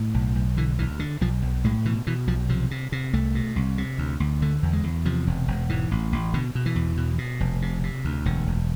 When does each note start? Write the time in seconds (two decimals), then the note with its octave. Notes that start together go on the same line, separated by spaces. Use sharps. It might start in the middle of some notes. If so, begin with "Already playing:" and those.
Already playing: A2
0.14 B1
0.35 B1
0.57 D3 E3
0.78 D2 E3
0.99 D3
1.21 B1 F3
1.42 B1
1.64 A2 G#3
1.85 B2 E3
2.07 B2 E3
2.27 B1 F3
2.49 C3 F3
2.71 C3
2.92 C3
3.13 C2 A3
3.35 B2
3.56 C2
3.78 C3
3.98 D2
4.20 D2
4.42 D3 A3
4.63 E2
4.73 G#3
4.84 E2
5.05 C3 F3
5.27 E1
5.48 E1
5.69 G#2 E3
5.91 A1
6.12 A1
6.34 B2 D3
6.55 B2
6.66 E3
6.76 E2
6.97 B2
7.18 B2
7.40 F1
7.62 C3
7.83 C3
8.05 D2
8.25 E1 D3
8.47 E1